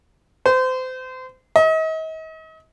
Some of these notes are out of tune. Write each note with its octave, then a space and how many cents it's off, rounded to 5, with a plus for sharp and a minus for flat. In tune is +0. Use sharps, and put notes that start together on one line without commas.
C5 -30
D#5 +40